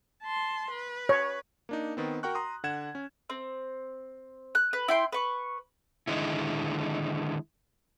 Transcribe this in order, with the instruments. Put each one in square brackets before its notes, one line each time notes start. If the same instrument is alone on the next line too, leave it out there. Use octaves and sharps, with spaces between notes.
[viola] A5 C6
B4
[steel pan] C#5
[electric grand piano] A#3 D4 D#4
D#3 B3 C4
F#4 A#4 F#5 G5 C#6 F#6
A#5 C6 D#6
D3 F#5 G#6 E7
C#4
[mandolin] C4
F#6
B4
E4 G5 C6
B4 C#6
[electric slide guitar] D3 D#3 G#3 E4